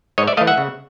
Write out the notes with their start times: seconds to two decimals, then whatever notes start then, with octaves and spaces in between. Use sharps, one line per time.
0.18 G#2 C#5 D#5
0.27 D5 E5
0.37 E3 A3 D#5 F5
0.47 E5 F#5
0.58 C#3